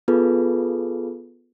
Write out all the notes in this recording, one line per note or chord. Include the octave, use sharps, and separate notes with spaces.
B3 F4 G#4 A4 B4